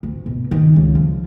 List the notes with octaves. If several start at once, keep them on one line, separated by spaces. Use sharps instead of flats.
D2
B2
D#3
C#2
F3